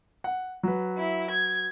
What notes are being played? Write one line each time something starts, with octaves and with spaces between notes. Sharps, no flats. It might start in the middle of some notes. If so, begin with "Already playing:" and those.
F#5
F#3 B4
E4
G#6